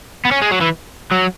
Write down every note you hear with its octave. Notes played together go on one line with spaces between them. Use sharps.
B3
C#4
G#3
F#3
E3
F#3